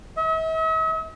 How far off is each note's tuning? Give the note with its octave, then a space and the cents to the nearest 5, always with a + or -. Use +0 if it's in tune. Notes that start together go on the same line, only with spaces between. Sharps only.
E5 -45